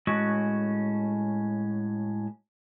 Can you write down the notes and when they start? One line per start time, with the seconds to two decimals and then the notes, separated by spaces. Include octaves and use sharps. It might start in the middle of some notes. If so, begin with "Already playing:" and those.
0.07 A2 G#3 C#4 F#4